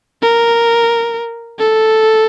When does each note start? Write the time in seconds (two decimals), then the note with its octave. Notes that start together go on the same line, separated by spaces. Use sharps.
0.22 A#4
1.59 A4